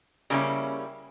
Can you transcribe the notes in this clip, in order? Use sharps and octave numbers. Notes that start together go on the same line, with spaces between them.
C#3 G3 A#3 C#4 E4